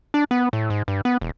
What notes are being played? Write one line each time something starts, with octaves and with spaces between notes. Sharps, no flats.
D4
B3
A2
G#2
G2
B3
E1